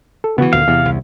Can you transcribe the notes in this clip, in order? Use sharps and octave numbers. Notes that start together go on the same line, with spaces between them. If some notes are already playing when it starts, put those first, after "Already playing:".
A4
C#3 E3 B3 F#4
D2 A#2 F5
E2 C3
C2